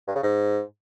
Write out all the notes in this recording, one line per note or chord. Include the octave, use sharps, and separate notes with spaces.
G2
C#3
G#2